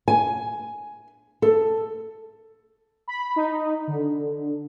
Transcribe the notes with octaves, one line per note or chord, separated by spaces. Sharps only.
G#5
A4
B5
D#4
D3